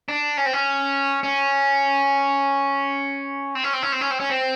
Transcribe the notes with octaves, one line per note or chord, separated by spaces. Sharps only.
D4
C#4
C4
C#4
C#4
C4
C#4
C4
C#4
C4
C#4
C4
C#4
C4